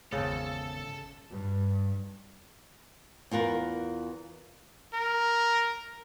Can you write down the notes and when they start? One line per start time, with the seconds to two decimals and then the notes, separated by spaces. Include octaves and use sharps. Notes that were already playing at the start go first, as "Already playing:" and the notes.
0.12 G#1 E2 C#3 A4 A5
1.30 G2
3.31 E2 F4 A#4 B4
4.94 A#4